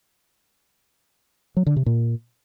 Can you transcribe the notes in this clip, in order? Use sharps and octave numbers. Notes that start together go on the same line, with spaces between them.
F#3
D3
C3
A#2